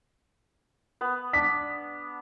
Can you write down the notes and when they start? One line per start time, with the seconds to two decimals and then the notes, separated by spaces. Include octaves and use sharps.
1.01 B3 B4
1.33 D4 B6